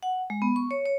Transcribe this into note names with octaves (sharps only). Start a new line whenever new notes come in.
F#5
G#3
B3
C#6
C#5
C#5